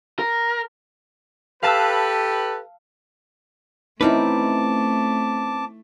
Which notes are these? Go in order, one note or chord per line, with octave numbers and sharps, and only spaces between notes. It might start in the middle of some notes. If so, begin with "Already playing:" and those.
A#4
G4 A4 B4 F5 A5 E6
A3 C4 C#4 D#4 E4 B4 A5 D6